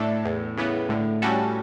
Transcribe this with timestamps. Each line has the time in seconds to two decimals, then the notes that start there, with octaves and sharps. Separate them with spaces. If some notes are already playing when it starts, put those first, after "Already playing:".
Already playing: A2 A3 D4 A4
0.25 E2
0.57 C#3 E3 B3
0.89 A2 D3
1.22 G3 C#4 F#4 A4